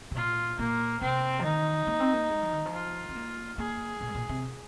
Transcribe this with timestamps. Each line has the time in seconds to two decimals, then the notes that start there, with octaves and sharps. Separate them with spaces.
0.11 C3
0.16 A#2 F4
0.59 A#2 A#3
1.01 C3 C4
1.39 F3
1.44 D#3 D#4
1.87 A#3
2.00 C4
2.13 A#3
2.29 G#3
2.42 F3
2.53 D#3
2.66 F3
2.73 F4
3.09 C4
3.15 A#3
3.58 A#3 G#4
4.01 A#2
4.08 G#2
4.15 A#2
4.29 C3